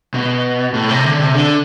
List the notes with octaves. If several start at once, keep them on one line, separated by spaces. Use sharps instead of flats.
B2
A2
C3
D3
C3
D3